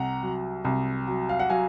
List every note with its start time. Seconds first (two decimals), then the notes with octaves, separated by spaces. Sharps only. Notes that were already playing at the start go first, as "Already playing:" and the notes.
Already playing: C2 F#5 A#5
0.23 F#3
0.65 C2
1.08 F#3
1.29 F5
1.40 F#5
1.50 F#3 F5 G#5